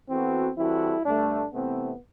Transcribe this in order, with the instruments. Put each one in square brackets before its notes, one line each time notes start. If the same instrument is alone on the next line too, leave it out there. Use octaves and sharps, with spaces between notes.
[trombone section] E3 B3 F#4 A4 [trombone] C4
[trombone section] E3 G3 C4 F#4 A4 [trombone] E4
[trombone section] G2 D3 A3 [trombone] D4
[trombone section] C3 E3 A3 C4 [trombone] B3